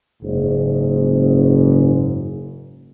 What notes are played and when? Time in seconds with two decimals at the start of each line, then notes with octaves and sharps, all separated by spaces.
0.23 F#1 G#2